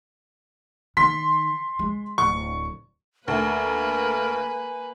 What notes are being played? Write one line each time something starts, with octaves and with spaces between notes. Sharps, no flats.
D#3 C6 B6
G#3
D1 C#6
D2 A#3 A#4 B4 G#5